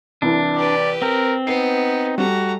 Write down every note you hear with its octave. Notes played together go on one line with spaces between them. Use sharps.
C2 E3 D4
G4 B4 D5
C4 A#4 G5
B3 D#4 C7
G3 A3 F#4 A#5